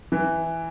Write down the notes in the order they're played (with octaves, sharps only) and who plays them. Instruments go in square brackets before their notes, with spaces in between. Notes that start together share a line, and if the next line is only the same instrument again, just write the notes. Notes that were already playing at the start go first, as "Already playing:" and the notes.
[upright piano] E3